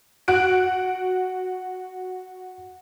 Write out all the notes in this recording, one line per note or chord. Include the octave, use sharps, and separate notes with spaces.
F#4 F#6 D7